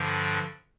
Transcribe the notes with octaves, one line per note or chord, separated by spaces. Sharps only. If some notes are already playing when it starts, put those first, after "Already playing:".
Already playing: G2 D3 F3